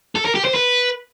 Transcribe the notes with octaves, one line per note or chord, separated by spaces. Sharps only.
A4
A#4
G4
C5
B4